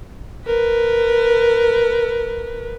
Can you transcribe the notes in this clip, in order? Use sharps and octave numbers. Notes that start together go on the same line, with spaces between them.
A#4 B4